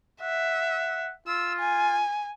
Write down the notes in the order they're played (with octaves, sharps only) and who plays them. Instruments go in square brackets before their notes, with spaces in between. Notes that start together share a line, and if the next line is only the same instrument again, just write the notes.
[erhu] E5 [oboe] F#5
[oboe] F4 [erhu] E6
[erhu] G#5